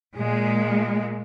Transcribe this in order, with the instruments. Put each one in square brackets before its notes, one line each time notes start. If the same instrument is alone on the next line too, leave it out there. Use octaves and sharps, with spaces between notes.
[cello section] A#2 G#3